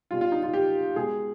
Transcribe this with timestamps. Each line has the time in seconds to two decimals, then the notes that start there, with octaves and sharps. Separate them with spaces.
0.11 B2 G3 F4
0.21 F4
0.32 D#4
0.43 F4
0.53 G4
0.96 B2 G#3 G#4